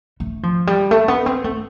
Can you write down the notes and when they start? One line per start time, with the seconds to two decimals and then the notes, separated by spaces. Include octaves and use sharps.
0.20 A3
0.43 F3
0.67 G3
0.91 A3
1.08 B3
1.26 C4
1.44 A3